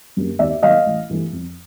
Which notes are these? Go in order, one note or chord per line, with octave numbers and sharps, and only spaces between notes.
F#2 D3 G3 A#3
D#2 D5 E5
D#3 F#3 A#3 D#5 F5
A1
G2 E3 A3
F2